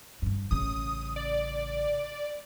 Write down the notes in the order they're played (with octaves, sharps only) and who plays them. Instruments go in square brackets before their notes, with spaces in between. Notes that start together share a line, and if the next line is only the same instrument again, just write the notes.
[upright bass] G2 D3
[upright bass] A1 C#3 [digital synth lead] D#6
[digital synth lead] D5